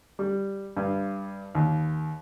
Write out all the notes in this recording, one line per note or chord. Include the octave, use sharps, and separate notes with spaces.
G3
G2
D#2